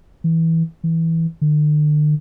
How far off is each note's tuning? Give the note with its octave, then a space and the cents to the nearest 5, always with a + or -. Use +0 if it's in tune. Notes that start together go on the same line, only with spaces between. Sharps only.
E3 -15
E3 -10
D3 +40